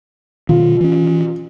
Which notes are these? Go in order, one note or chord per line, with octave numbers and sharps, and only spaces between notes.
B2 D#3 F4
E3 C#4